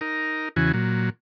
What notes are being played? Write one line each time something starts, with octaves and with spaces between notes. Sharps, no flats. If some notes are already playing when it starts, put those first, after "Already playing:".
D#4 A#4
E2 C#3 E3 F#4 G#5
A#2 F#3